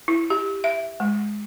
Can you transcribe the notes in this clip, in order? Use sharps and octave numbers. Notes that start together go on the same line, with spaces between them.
E4
G4
E5
G#3